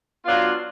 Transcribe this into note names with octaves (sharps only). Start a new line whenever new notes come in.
F#3 B3 D4 F4